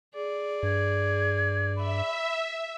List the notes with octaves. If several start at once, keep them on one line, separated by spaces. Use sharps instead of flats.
G#4 D5
G2 G#6
E5 B5